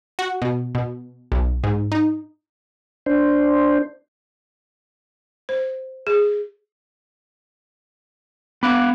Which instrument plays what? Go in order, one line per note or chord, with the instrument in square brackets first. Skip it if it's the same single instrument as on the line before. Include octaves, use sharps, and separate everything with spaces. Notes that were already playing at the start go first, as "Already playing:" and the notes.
[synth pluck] F#4
B2
B2
B1
G#2
D#4
[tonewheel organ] D4 C5
[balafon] C5
G#4
[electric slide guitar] B3 F5 [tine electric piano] B5 D6 F#6